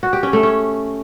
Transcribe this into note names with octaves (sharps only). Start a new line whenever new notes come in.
F#4
G4
C#4
A3
C#4